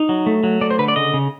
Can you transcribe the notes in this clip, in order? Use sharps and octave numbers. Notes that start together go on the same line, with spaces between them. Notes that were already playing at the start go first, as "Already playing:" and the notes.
Already playing: D#4
F#3
A3
F#3
A3 D5
C5
D3 B4
D5
C#3 D#5
C#3